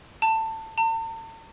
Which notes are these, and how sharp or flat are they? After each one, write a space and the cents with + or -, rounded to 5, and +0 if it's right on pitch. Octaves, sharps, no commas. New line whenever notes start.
A5 +20
A5 +45